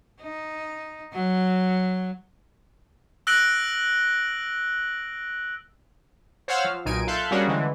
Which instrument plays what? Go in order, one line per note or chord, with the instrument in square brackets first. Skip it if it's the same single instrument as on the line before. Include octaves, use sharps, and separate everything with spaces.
[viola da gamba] D#4
F#3
[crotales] E6 F#6 A#6 D7 F#7 G7
[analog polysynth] C5 C#5 F5 F#5 E6 F6
F3
B1 A#2 D#4 G#5 D7 D#7
A4 E5 F5 C6 F#6 G6
G3 A#3 C#4 D4 F#4 G#4
D3 E3 G#3